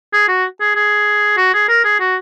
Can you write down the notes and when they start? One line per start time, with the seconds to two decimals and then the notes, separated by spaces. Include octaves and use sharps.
0.13 G#4
0.28 F#4
0.60 G#4
0.76 G#4
1.37 F#4
1.54 G#4
1.69 A#4
1.84 G#4
2.00 F#4